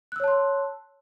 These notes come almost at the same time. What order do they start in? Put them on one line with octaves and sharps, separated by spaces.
F#6 E6 C#5 A5 C6